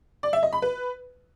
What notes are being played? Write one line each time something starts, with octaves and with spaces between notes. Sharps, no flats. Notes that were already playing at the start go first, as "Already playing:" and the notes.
D5
E5
D#5
B5
B4